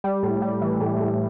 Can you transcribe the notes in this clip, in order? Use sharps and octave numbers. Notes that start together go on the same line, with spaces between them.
G3
A2
G3
E3
A2
A2